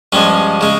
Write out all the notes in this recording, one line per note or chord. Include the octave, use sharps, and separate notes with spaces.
G2 F3 G#3 C#4
C#3 G#3